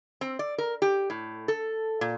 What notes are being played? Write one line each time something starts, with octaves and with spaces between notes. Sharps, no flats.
C4
D5
A#4
G4
A2
A4
A#2